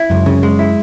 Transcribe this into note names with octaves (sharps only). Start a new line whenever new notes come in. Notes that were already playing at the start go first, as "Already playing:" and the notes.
Already playing: E4
C#2 F#2
C#3
G#3
E4